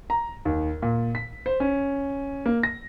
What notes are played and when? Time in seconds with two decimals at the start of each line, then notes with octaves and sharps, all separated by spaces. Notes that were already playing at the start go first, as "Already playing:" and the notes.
0.10 A#5
0.45 D#2
0.82 A#2
1.15 B6
1.46 C5
1.60 C#4
2.46 A#3
2.63 A#6